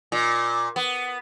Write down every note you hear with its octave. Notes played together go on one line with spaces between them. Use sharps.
A#2
B3